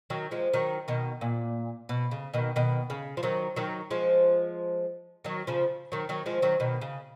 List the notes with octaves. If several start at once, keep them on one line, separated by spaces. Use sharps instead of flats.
D#3 F#3
F3 G#3
D#3 F#3
B2 D#3
A#2
B2
C#3
B2 D#3
B2 D#3
C#3
F3
D#3 F#3
D#3 F#3
F3 G#3
D#3 F#3
C#3 F3
D#3 F#3
D#3 F#3
F3 G#3
D#3 F#3
B2 D#3
C#3